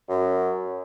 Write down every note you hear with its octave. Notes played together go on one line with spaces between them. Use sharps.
F#2